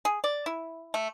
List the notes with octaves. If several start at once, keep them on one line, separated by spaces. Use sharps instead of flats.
G#4
D5
E4
A3